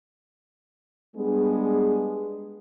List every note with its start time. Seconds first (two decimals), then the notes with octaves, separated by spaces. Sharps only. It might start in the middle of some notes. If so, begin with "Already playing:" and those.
1.16 G3 G#3 B3 D4 G#4